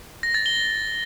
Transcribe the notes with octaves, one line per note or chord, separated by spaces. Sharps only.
A#6
A6
G7